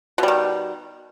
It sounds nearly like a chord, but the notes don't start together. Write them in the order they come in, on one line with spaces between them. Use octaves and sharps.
B2 G3 D#3